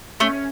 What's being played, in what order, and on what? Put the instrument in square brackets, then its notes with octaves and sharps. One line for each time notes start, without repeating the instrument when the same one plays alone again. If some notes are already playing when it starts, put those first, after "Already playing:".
[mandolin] A3 [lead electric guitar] C#4